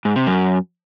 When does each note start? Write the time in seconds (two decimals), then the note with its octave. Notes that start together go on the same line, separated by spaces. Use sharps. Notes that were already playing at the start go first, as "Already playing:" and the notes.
0.05 G#2
0.16 C3
0.26 F#2